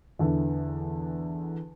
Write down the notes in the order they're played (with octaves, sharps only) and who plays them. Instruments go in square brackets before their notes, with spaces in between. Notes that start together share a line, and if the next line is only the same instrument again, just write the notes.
[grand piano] E2 D3 E3